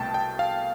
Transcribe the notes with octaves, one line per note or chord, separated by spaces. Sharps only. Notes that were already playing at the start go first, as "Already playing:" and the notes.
Already playing: C2 B2 A3 G5 A5
G5
F5